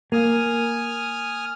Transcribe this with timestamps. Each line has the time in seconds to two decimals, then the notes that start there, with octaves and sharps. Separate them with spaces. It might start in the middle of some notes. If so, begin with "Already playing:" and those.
0.12 A#3 G#5 D#6 F6